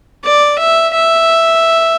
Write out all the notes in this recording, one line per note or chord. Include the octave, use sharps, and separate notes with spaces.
D5
E5
E5